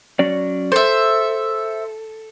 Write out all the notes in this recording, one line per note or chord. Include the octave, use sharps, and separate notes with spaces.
F#3 C#4 D5
A4 C5 E5